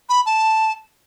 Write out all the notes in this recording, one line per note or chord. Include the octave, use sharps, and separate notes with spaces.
B5
A5